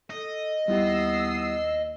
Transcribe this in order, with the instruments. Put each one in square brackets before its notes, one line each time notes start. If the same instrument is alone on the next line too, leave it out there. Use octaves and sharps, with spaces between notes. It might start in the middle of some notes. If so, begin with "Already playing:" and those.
[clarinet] A4 [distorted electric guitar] D#5
[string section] D#2 E6 C7 [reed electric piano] G3 E4 G4 [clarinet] B3